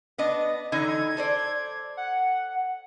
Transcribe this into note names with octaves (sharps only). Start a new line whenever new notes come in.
B3 D4 D#5
D3 E3 D#4 G#6
A4 C5 D5
F#5